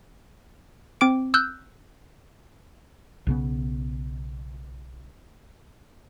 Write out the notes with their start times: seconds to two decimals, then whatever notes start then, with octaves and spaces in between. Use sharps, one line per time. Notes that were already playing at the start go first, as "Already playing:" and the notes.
1.01 C4 D6 D7
1.34 E6 F#6 G6
3.27 B1 C#3 B3